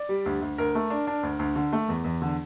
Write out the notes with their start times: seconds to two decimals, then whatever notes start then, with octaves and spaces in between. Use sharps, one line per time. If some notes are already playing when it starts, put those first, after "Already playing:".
Already playing: D5
0.09 G3
0.26 D2
0.42 D2
0.58 D2 A#4
0.75 A3
0.90 D4
1.07 D4
1.23 D2
1.39 D2
1.56 D3
1.73 A3
1.89 E2
2.04 E2
2.22 D3